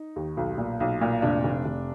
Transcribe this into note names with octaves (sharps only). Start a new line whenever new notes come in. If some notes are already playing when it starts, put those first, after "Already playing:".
Already playing: D#4
D#2
B1
A#2
B1
A#2
F1 D4
F1
F1